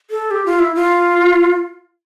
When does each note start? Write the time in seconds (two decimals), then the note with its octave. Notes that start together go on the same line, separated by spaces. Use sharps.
0.11 A4
0.31 G4
0.46 F4
0.60 E4
0.75 F4